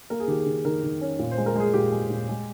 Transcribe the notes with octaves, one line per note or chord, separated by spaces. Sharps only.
A#3 A#4
G#4
D#3 G4
G#4
D#3
D#3 A#4
D#3
C#4
A#2
C5
G#3
A#4
G#3 G#4
A#2 G4
G#3
A#2
G#3